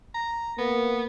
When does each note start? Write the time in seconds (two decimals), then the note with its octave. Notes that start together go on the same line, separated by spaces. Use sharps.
0.14 A#5
0.58 A#3 B3